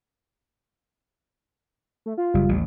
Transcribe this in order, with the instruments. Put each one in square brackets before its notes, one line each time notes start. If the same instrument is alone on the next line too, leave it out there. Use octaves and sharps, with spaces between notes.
[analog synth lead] A3
F4
[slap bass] F#1 [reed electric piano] G3
[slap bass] A1 D#2